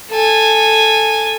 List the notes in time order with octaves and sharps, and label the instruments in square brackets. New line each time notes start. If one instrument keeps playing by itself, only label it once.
[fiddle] A4 G#5